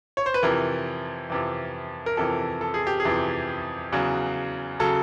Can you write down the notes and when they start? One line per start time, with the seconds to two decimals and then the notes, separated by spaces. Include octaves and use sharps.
0.17 C#5
0.26 C5
0.34 B4
0.43 F2 C3 E3 A#4
1.30 F2 C3 E3
2.06 A#4
2.17 F2 C3 E3 A4
2.61 A4
2.74 G#4
2.87 G4
3.00 G#4
3.05 F2 C3 E3
3.92 E2 C#3 F#3
4.80 C#3 F#3 A4